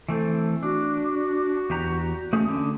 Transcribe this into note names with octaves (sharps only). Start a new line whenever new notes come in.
E3 A3 C4 A4
D4 F#4
E2 G4 A#5
A3 C#4 G#4
D3 C#4